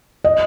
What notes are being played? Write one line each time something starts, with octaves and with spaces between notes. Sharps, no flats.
D#5